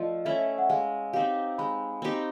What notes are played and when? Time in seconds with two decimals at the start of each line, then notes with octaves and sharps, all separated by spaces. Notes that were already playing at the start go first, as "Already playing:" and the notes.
Already playing: F3 A3 D5 D#5
0.25 A3 C#4 E4 E5
0.59 F#5
0.69 G#3 F5
1.13 C4 D#4 G4 F5
1.58 G#3 B5
2.02 C4 D#4 G4